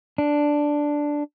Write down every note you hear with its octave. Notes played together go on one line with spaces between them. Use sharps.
D4